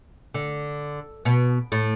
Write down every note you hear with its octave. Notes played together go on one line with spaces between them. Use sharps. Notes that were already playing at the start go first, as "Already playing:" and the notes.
D3
B2
A2